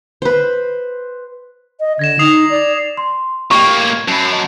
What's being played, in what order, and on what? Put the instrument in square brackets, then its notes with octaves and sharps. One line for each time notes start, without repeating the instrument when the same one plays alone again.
[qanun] B4 C5
[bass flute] D#5
[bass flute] D3 [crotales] G#6 A#6 E7
[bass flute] D#4 [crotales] D#6 C7 F7
[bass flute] D5
[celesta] C6
[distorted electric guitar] A2 A#3 [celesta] G4 D#5 G5 [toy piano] C#6
[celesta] G#6
[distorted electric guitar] F#2 [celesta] A5 B5
[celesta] D#5 A5